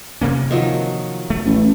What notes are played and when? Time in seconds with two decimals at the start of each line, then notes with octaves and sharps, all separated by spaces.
0.21 C3 A#3 C#4
0.51 D#3 F3 F#3
1.30 A3
1.46 A1